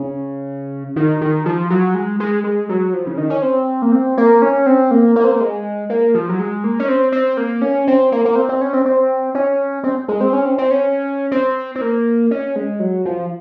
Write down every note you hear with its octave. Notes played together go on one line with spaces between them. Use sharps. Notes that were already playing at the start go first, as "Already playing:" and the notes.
Already playing: C#3
D#3
D#3
F3
F#3
G#3
G#3
G#3
F#3
F3
C#3
D#3
C#4
C4
A#3
C4
A#3
C#4
C4
A#3
A#3
C4
A#3
G#3
A#3
F3
F#3
G#3
A#3
C#4
C4
C4
A#3
C#4
C4
A#3
A#3
C4
C4
C#4
C4
C4
C#4
C4
G#3
C4
C#4
C4
C4
C#4
C4
C4
A#3
C#4
G#3
F#3
F3